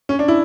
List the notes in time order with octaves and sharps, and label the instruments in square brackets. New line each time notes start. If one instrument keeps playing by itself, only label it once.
[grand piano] C#4
D4
E4